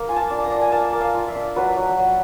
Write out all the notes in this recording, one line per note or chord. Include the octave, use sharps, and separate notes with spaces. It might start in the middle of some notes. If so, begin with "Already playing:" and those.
Already playing: A#3
F4 G#5
A5
D4
A#5
D4
G#5
A#3 A5
A#3
F5
F4
E5
D4
F#3 B4
F#3
F#3